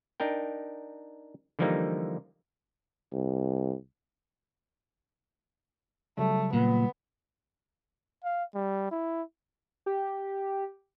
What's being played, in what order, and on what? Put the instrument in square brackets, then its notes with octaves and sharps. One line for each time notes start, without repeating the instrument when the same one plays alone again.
[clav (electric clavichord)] D4 D#4 A#4 G5
D3 E3 F3 G3 A#3 D#4
[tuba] C2
[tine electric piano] C#3 F#3 G3 [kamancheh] A3
[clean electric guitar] A#2 [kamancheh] B3
[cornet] F5
G3
E4
[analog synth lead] G4